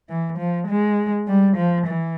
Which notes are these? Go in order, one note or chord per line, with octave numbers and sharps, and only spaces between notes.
E3
F3
G#3
G3
F3
E3